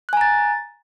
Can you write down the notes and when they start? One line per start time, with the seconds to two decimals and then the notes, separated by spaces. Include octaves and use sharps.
0.09 F#6
0.13 G#5
0.17 A#5
0.21 A6